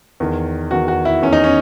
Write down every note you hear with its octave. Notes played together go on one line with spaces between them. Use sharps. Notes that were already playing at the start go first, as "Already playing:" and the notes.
E2 D#3
E2 D#3 F#4
F#4
E4
E2 D#3 C#4
D#4
C#4